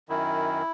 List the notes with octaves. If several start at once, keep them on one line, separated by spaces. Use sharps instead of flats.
F#2 D#3 E4